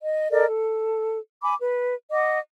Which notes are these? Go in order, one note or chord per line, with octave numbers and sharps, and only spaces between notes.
D#5
A4 A#4 D5 D#5
A4
G#5 B5 D6
B4
D#5 F#5 D6